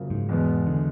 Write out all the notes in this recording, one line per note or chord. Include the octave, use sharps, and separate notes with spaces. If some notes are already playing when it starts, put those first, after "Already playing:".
Already playing: F#2 C#3 F3 A#3
G#2
E2 B2 G#3 B3
D3